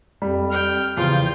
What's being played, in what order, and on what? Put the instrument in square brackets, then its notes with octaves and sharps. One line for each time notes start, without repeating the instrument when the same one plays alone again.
[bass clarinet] F2 [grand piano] G3
[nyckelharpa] G5 [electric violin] F6
[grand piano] E2 F3 [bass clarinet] C#3 [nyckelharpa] F4 G5 [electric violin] G6